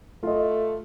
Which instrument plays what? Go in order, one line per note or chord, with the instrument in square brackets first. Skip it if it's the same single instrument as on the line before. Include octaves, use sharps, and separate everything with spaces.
[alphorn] A3 [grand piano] F4 D#5